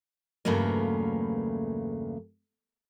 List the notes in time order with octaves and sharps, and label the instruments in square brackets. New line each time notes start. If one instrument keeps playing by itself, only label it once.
[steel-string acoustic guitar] E2 G2 C#3 F#3 A3 A#3